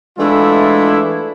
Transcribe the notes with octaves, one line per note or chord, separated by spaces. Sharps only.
E3 G#3 A3 D4 E4 F4